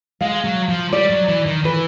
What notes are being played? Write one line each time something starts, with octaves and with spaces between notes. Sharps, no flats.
G#3 F5
F#3
F3
G3 D5
F#3
E3
D#3
E3 B4